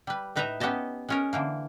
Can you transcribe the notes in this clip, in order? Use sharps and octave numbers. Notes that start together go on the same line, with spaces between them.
G3 B4
A2 D#4 B4 D#5 E5 A#5
B3 C#4 G4 D#5 A5
G#3 C#4 A#4
D3 E3 A#3